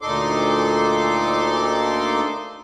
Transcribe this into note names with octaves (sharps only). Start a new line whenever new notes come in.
D2 A#2 D#4 A4 C6 D6